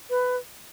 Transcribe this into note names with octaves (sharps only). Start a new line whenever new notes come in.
B4